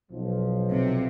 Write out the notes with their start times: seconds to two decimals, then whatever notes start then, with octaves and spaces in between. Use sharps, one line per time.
0.11 B1 F3
0.72 C3